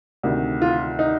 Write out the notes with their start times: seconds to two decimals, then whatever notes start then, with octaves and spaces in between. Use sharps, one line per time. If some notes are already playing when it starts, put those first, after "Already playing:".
0.23 D2 C3 D#3
0.62 F4
0.99 D#4